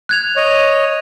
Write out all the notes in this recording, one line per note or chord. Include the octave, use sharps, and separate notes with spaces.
F#6 G#6 F7
C#5 D#5